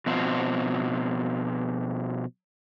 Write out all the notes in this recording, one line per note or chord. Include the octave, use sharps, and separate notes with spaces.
B2 F3 C4 F#4